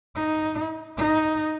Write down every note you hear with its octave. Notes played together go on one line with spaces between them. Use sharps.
D#4
D#4